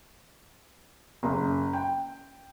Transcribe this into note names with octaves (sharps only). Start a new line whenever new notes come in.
F#1
G5